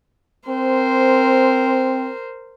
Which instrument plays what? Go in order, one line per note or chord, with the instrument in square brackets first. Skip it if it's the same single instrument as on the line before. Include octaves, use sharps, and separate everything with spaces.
[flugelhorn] C4 [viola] A#4 C5